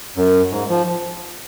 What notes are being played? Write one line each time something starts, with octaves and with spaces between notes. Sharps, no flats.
F#2
G#2
F3